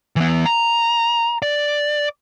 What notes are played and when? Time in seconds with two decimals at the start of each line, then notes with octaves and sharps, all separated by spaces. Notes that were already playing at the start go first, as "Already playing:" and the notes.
0.16 E3 B3
0.46 A#5
1.42 D5